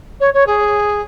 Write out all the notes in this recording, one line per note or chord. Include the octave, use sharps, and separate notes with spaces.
C#5
C#5
G#4